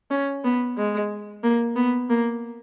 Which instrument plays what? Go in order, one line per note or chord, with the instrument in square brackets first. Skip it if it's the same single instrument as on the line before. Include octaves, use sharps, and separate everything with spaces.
[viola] C#4
B3
G#3
A#3
B3
A#3